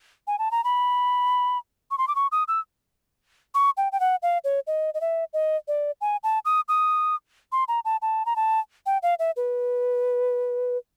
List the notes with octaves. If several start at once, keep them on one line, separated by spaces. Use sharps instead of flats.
G#5
A5
A#5
B5
C#6
C6
D6
C#6
D#6
E6
C#6
G5
G5
F#5
F5
C#5
D#5
D#5
E5
D#5
D5
G#5
A5
D#6
D#6
C6
A#5
A5
A5
A#5
A5
G5
F5
E5
B4